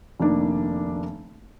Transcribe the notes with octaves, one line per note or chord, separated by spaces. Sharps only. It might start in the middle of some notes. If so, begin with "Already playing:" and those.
F1 D#3 A#3 D4